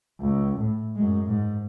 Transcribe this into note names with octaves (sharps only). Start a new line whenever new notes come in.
C#2
A2
F#2 G#3
G#2